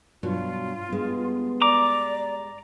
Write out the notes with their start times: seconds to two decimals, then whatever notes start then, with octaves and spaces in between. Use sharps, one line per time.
0.23 G2 B2 F#3 F4
0.90 G2 G#3 B3
1.62 D5 A#5 D6